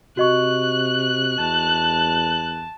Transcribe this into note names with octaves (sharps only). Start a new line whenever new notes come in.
C3 F#4 D#5 C#6 F#6
E2 A5